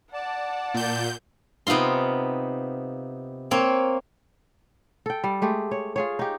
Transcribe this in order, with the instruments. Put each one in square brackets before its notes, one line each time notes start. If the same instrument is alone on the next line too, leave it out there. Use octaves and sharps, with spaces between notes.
[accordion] D5 A5 [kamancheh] F#5
[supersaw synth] A#2 G6
[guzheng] C3 B3 D#4 F4 C6
A#3 C4 C#5
[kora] A4 G5
G3
G#3 A3 G4
C#5
F4 G#4 C#5
D#4 G4